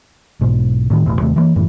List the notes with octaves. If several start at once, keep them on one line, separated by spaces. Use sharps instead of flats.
B1 G#2 B2
A2 D#3
E1 A1
D#2 C3 A3
E3 G3 A#3
F#1 F#2 A2 E3